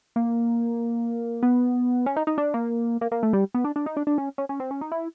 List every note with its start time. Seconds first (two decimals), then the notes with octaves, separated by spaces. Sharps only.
0.16 A#3
1.43 B3
2.06 C#4
2.16 D#4
2.27 D#4
2.38 D4
2.54 A#3
3.01 A#3
3.12 A#3
3.23 A3
3.33 G3
3.54 B3
3.64 D4
3.76 D4
3.86 D#4
3.97 D4
4.07 D4
4.18 C#4
4.38 C#4
4.49 C#4
4.60 C4
4.71 C#4
4.81 D#4
4.92 E4